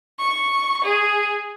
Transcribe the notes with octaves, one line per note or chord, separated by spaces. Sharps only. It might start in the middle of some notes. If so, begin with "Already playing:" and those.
C#6
G#4